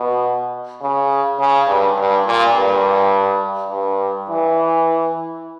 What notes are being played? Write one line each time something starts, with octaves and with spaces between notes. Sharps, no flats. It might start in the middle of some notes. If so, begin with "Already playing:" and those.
Already playing: B2
C#3
C#3
G2
G2
A#2
G2
G2
E3